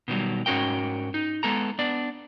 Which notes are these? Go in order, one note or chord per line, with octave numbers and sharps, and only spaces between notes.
B2 D#3 F#3 G3
G#2 C#4 F#4 A#4 G5
D#4
G#3 B3 A4 A#5
B3 D4 D5